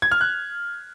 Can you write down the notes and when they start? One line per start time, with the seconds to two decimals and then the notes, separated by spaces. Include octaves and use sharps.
0.02 G#6
0.12 F6
0.21 F#6